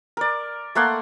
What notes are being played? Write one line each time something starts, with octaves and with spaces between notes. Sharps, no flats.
A#4 D5
A3 A#3 F#5 C6